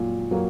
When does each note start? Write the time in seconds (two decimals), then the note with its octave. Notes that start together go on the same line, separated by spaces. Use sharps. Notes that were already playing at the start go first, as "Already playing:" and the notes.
Already playing: A#2 F#3
0.31 F#3 A#3